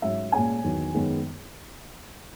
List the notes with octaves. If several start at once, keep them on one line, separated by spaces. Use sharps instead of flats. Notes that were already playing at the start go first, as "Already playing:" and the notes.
G#2 F#3 C#4 E5
A#2 G#3 C#4 G#5
E2 D#3 F#3 B3
F#2 D#3 G#3 B3